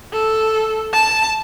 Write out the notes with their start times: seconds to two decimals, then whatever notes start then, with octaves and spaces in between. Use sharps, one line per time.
0.12 A4
0.93 A5